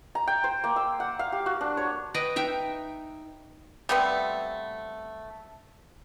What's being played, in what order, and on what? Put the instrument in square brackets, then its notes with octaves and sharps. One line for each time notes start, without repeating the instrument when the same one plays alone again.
[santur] A#5
G5
C5
A#3
E6
F#5
F5
G4
F#4
D4
C#5
[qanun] B4 D#5 G5 G#5
D#4 E5 G5
[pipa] G3 A3 B3 C4